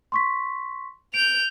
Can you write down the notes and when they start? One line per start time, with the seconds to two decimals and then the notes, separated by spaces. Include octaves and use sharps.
0.12 C6 C#6 B6
1.14 G6 D7 F7